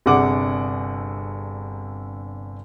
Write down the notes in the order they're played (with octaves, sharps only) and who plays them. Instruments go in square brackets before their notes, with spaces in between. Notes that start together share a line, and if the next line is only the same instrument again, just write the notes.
[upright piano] G1 C3 D4 G#4 F#5 D6